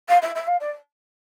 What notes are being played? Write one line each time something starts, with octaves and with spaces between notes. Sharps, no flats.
F5
E5
E5
F5
D5